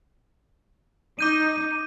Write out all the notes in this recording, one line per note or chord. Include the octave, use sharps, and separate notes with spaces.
D#4 D6 G6 D#7